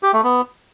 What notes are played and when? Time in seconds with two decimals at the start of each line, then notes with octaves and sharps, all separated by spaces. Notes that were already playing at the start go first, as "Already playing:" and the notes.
0.03 G4
0.13 A3
0.24 B3